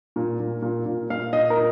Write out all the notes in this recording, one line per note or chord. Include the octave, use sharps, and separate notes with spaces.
A#2
A#2
A#2
A#2
A#2 F5
A#2 D#5
A#4
A#2